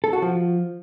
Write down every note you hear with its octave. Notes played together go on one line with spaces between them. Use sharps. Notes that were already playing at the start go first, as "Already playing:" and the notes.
A4
F#4
F3